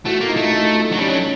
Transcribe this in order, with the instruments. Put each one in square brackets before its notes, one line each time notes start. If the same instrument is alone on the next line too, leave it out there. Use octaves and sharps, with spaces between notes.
[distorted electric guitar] A3 [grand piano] E4 F#4
[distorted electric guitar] A#3
[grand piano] D#4 F4
[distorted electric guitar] A3
[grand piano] D#4 F4
D#4 F4
[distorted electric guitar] F#3 [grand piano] D4
[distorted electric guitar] G3 [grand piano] C#4 D#4
[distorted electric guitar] F#3